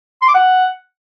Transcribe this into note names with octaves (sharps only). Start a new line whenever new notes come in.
C6
D6
F#5